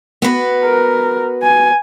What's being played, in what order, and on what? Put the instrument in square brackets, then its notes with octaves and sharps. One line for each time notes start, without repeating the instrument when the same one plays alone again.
[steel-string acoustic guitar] B3 F#4 B4
[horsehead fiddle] A#4
G#5